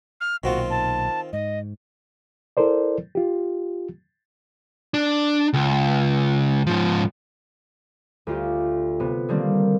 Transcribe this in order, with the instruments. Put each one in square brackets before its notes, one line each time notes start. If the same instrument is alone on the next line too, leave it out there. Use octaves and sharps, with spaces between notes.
[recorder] F6
[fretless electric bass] B1 A#2 [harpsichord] D#3 C4 F4 [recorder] F#4
[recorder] A5
[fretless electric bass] G#2 [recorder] D#5
[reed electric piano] E4 A4 A#4 C5 D5
F4 G4
[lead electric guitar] D4
C#2
G#2 F3
[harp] D2 F4 G4
C3 B3
D3 D#3 G3 A#3 C4